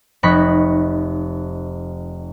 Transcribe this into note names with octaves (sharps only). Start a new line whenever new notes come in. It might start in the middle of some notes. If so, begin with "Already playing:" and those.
F1 D#4 B5 C#6 F#6 B6